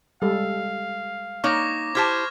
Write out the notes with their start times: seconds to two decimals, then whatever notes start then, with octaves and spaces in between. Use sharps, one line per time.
0.22 G3 G#3 A4 F5
1.44 A#3 D#4 C#5 C#6 D6 A#6
1.95 E4 G4 C5 A5 F6 G#6